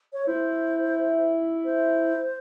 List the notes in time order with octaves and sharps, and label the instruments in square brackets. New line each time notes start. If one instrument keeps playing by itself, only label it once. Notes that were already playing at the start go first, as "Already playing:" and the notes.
[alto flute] C#5
[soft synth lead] E4 [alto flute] C5
[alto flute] C5